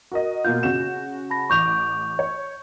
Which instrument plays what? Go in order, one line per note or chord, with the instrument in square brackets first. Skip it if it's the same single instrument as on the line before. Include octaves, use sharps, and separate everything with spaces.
[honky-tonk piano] F#4 A#4 D#5
[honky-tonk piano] B2 A#3 F4 [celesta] G6
[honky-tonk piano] C#3 F#4 E7
[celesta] A5 B5 A#6
[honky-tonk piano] A1 E3 D6 [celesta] C#6 G6 F7
[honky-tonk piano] C#5